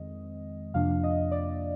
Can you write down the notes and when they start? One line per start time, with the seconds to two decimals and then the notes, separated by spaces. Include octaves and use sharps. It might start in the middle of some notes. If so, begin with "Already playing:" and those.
Already playing: F2 D#3 G#3 C4 D#5
0.74 F2 C3 F3 A#3 D4 F5
0.91 F5
1.03 D#5
1.31 D5